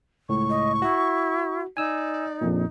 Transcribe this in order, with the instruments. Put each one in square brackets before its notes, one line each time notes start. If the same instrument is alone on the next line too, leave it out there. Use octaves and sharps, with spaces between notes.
[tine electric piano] C#2 A2 [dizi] C#6
[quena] D#5
[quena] E4 [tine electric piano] F#4
[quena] D#4 [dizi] D5 [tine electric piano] G#5 E6
[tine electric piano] A#1 F2 A#2